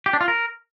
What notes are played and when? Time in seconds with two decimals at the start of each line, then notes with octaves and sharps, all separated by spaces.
0.06 G4
0.13 D4
0.21 F4
0.28 A#4